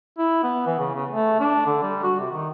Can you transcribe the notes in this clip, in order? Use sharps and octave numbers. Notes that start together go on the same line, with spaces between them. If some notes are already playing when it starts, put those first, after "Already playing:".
E4
B3
E3
C#3
C#3
A3
D4
D3
G3
F#4
C3
D#3